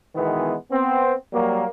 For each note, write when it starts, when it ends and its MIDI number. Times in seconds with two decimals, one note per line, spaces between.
0.15 0.55 47
0.15 0.55 51
0.15 0.55 52
0.15 0.55 56
0.15 0.55 59
0.71 1.13 59
0.71 1.13 60
1.33 1.66 54
1.33 1.66 55
1.33 1.66 58